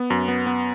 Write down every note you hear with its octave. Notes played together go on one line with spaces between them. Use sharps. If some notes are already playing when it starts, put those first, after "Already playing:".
Already playing: B3
F#2
B3
B3